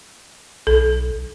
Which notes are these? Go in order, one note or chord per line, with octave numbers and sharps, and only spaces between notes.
B1 A4